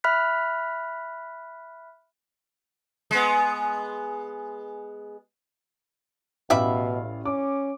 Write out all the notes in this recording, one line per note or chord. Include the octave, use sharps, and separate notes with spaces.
E5 B5 F6 F#6 B6
G#3 B3
A1 B2 G3 E5 F5 B5
C#4 D6